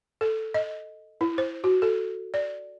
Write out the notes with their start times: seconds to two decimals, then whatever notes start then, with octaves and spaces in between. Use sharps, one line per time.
0.21 A4
0.54 D#5
1.21 E4
1.38 C5
1.64 F#4
1.82 A4
2.34 D5